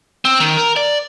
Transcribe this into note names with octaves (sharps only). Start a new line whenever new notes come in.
C4
D#3
A#4
D5